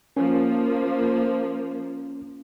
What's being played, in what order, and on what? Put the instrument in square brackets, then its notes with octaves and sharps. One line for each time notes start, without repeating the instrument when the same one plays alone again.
[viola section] F3 A#3 [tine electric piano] C#4